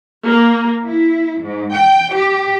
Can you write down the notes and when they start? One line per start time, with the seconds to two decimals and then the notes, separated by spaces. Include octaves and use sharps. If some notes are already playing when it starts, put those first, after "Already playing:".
0.25 A#3
0.87 E4
1.42 G#2
1.74 G5
2.16 G4